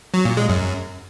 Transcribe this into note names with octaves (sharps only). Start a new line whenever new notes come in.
F#3
A#2
G#3
F#2